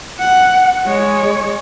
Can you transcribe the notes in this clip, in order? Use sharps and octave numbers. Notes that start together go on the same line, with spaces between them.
F#5
G#3 C#5